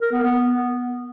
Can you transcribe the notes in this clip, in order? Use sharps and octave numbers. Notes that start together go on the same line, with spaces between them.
A#4
B3
B3